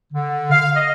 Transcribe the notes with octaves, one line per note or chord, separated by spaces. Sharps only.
D3
F5
D#5